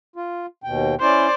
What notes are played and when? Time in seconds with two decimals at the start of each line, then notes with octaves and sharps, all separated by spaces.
0.16 F4
0.64 D#2 B2 G5
1.01 C#4 E4 C5 D5